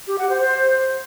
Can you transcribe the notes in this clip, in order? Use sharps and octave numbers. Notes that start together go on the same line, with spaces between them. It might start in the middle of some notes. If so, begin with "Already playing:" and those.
G4
F#5
C5
C5